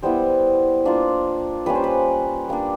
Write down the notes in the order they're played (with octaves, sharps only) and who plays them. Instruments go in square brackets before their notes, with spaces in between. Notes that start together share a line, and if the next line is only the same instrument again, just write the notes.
[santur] G3 B3 E4 C5
A#3 D4 F4
G3 A#3 C#4 B4
C5
B4
G3 A#3 D4